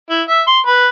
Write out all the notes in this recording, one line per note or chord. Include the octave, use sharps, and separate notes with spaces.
E4
E5
C6
B4